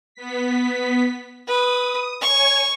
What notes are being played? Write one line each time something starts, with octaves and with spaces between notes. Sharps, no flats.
B3 B6
B4 D#6
C#5 G#5 C#6